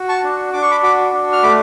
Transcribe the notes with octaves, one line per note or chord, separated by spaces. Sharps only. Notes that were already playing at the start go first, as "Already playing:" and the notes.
Already playing: F#4
A5 C#6
D4
D4 D6
C#6
B5 D6
F#4 B5 D6
D4
F6
A3 B5 D6